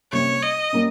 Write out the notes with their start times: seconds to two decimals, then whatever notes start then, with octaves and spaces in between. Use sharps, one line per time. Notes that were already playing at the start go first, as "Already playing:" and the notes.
0.12 C3 G3 A#3 C#4 C#5
0.42 D#5
0.73 G3 A#3 C#4